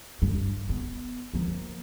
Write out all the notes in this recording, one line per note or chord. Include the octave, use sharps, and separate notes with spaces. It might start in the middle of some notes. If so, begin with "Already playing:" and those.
G2
B3
F3 A#3